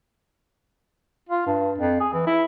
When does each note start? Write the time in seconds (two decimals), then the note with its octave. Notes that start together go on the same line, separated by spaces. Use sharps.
1.29 F4
1.47 G2
1.78 F2
2.00 G#4
2.13 E3
2.26 E4